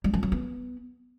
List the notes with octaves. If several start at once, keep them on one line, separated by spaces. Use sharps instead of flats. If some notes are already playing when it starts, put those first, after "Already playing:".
G3
F3
F#3
B3